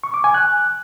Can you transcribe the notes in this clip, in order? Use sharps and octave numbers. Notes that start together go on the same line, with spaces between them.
C#6
D6
G#5
F#6